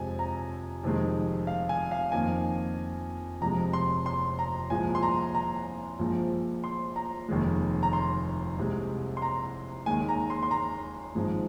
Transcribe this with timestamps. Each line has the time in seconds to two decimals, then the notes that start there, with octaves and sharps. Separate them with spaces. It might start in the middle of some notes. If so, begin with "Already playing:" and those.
Already playing: F2 C3 F3 G#3 G#5
0.19 A#5
0.83 F1 F2 C3 D#3 G#3
1.47 F5
1.69 G#5
1.91 F5
2.12 F2 D#3 A#3 G#5
3.41 F1 F2 C3 G#3 A#5
3.73 C6
4.06 C6
4.39 A#5
4.70 C2 A#2 F3 G#3 G#5
4.95 C6
5.03 A#5
5.35 A#5
5.99 A#1 A#2 F3 G#3
6.64 C6
6.96 A#5
7.29 F1 D#2 D#3 G#3
7.83 A#5
7.93 C6
8.58 C2 C3 G#3
9.17 C6
9.22 A#5
9.86 D#2 D#3 G#3 G#5
10.09 A#5
10.30 C6
10.43 C6
10.51 A#5
11.15 G#1 G#2 F3 G#3